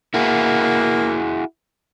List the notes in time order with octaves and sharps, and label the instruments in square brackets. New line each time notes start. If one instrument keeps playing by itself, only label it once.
[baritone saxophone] A#3 [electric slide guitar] E4 F#4 G#4